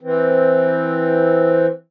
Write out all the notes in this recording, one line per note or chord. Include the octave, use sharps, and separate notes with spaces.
E3 C4